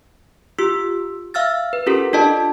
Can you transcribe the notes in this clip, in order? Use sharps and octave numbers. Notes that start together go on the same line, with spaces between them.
F4 G4 E6
E5 F5 E6 F6 A6
B4
C#4 F4 G4 A4 A#4
D4 F4 A4 D5 D#5 A5